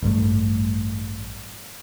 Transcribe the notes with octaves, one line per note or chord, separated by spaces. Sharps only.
A1 G2 G3 A3